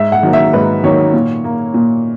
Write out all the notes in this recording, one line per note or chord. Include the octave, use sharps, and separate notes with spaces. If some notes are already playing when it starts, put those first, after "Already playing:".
Already playing: G#2 E5
F#5
D#3 F#3 A#3
E5
G#2 B4
D#3 F#3 A#3 C#5
A#2
A#3
A#2